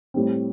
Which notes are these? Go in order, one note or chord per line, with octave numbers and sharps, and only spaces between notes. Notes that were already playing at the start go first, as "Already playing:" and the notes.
A2 G3 C4